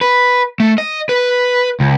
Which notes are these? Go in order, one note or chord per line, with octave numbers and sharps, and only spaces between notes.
B4
A3
D#5
B4
C#2